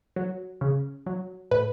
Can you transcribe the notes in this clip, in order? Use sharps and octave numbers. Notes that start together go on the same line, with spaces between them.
F#3
C#3
F#3
A2 B4